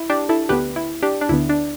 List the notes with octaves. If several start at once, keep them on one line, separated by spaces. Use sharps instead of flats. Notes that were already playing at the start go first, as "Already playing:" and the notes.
Already playing: E4
D4 G4
E4 A4
D2 D3 B3 G4 B4
E4
D4 G4
D4
D2 D3 B3 E4
D4